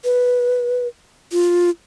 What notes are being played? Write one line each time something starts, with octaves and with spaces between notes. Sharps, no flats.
B4
F4